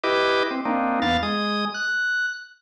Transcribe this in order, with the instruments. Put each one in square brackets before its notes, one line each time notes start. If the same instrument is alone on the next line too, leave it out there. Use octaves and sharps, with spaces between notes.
[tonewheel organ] E4 G4 B4 D#5 D6
C4
A#3 C4 D4 D#4
E2 B3 F5 A6
G#3 D#6
F#6